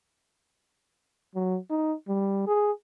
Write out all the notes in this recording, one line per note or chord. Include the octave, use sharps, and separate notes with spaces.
F#3
D#4
G3
G#4